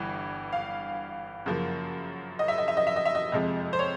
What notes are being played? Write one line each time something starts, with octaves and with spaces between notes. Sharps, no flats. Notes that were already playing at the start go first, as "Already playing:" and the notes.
Already playing: G1 G2 E3
F5
F#2 C#3 F3 A#3
D#5
E5
D#5
E5
D#5
E5
D#5
E5
D#5
F2 C3 F3 G#3
C5
C#5